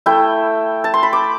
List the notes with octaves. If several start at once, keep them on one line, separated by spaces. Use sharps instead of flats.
A3 E4 G5
A5
C6
B5
D6